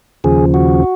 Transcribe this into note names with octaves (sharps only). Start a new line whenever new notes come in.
D#2 C#3 F3 G#4
F#4